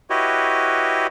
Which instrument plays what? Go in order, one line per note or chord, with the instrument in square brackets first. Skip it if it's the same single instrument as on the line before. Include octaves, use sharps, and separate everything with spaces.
[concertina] E4 F#4 G4 B4 C#5 D#5